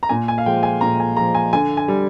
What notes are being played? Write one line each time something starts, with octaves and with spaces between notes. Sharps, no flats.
A#5
A#2 G#5
G#5
F5
F3 G#3 G5
G#5
A#2 A#5
G#5
F3 G#3 A#5
G#5
D3 G#5
G#5
G3